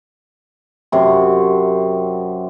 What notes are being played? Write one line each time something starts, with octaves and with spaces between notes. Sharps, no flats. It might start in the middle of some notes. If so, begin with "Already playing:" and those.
F#2 C3